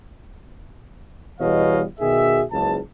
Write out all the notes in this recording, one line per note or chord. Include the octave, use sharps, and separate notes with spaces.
E2 B2 G3 C#5 D#5 F5
B2 D#3 F#4 G#4 E5
F#1 C#2 A5